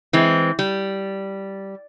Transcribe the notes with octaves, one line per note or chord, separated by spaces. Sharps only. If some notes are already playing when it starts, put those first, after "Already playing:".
E3 G#3 C4
G3